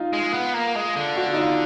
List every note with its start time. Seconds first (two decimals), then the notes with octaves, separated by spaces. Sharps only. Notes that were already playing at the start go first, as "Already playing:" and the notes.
Already playing: D#4 F4
0.13 G#3
0.33 B3
0.54 A#3
0.76 G#3
0.97 D3
1.16 F#4
1.33 D#4
1.37 F4